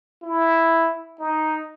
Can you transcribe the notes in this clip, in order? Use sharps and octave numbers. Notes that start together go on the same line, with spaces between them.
E4
D#4